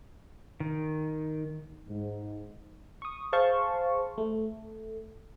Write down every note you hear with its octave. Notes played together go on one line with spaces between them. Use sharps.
D#3
G#2
C#6 D#6
G#4 C5 F5 A5 C6 C#6
A3